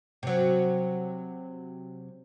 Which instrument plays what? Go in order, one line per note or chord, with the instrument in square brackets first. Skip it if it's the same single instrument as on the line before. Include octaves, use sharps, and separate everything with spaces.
[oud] C3 F#3